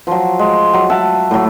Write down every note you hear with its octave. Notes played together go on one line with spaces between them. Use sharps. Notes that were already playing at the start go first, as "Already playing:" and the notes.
F3 F#3
G#3
F#3
E5 F#5 A5
A2 F#3